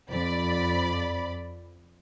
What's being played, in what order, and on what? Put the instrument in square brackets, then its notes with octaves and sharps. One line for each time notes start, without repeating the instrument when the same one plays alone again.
[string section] F2 D5 B5